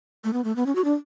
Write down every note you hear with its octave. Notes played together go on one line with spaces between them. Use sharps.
A3
B3
A3
B3
C#4
F#4
D4